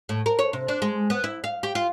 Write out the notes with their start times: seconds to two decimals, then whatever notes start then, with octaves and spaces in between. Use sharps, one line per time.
0.09 A2
0.26 A#4
0.39 C#5
0.53 C3
0.68 D4
0.82 G#3
1.10 B3
1.24 E4
1.44 F5
1.63 G4
1.75 F4